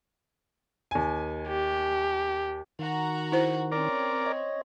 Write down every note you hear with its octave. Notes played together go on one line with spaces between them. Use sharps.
D#2 G#5
G4
D#3 F#4 A#5
E4 C5
C4 C#4 A#4 D5
C#5 D#5